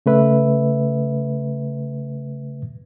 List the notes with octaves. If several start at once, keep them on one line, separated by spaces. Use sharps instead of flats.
C#3 A3 B4 E5